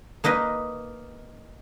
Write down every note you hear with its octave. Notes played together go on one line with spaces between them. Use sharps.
A#3 D#4 B4 D#5